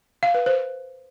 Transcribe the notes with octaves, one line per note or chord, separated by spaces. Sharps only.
F5
B4
C5